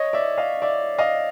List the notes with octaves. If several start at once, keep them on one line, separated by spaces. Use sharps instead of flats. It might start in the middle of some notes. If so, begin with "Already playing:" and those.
Already playing: C#5 D#5
D5 E5
D#5 F5
D5 E5
D#5 F5